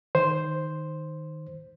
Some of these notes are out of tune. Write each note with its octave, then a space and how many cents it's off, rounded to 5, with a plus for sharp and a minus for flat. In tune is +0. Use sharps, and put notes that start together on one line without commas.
D#3 +0 C5 +0